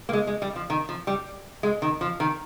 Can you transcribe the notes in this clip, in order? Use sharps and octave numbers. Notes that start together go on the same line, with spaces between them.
A#3
G#3
G#3
G3
F3
D#3
F3
G3
G#3
D#3
F3
D#3